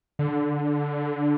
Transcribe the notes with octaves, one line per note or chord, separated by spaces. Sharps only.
D3